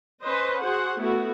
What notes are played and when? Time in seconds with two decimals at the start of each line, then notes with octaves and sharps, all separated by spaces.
0.22 C#4 B4 C5 D#5
0.62 F#4 G#4 C5 F#5
0.98 A3 B3 E4 F#4